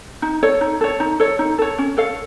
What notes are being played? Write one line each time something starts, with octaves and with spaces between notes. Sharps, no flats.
D#4
A4 C#5
D#4
A4 C#5
D#4
A4 C#5
D#4
A4 C#5
C#4
A4 C#5 F5